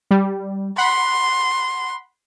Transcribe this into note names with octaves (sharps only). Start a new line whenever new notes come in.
G3
F#5 B5 C6